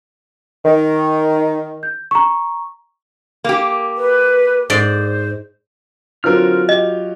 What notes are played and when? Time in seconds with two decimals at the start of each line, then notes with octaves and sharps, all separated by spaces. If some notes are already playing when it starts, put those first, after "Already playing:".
0.66 D#3 D#5
1.83 G6
2.11 A#5 C#6
3.44 A#3 G4
3.98 B4
4.70 G#2 C5 D5
6.24 D3 F#3 C4 F4 A#4 F6
6.69 G4 D#5